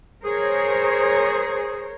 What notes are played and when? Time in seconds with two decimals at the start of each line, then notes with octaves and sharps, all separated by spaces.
0.24 G#4 A#4 C5 C#5